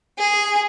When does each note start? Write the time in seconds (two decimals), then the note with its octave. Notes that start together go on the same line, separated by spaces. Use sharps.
0.19 G#4